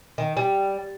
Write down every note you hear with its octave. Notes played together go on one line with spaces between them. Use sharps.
D#3
G3